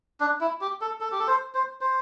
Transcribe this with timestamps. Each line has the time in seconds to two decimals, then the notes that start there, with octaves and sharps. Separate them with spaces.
0.20 D4
0.41 E4
0.61 G4
0.81 A4
1.01 A4
1.12 G4
1.20 A4
1.28 C5
1.55 C5
1.81 C5